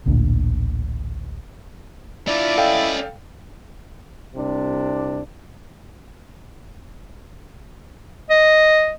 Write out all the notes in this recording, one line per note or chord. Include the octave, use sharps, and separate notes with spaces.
A1 D2 A#2 D3
D4 E4 F4 D5
C#4 A4 D#5 F5 G5
C2 C3 D4
D#5